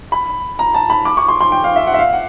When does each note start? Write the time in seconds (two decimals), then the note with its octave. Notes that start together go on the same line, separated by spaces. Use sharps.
0.12 B5
0.59 A#5
0.74 A5
0.90 B5
1.05 D6
1.17 C#6
1.29 C6
1.41 C6
1.52 G5
1.64 F5
1.76 E5
1.87 F#5
1.94 E5
1.99 F5
2.13 F#5